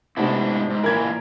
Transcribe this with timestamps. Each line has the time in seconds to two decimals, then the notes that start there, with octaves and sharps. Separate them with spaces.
0.17 G#2 C3 A3 B3 D4 E4
0.70 G#2
0.84 A#2 E3 E4 A#4 G#6